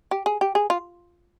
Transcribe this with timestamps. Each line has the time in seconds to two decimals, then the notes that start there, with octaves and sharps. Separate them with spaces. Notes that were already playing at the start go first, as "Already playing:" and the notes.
0.11 G4
0.26 G#4
0.41 G4
0.55 G#4
0.70 F4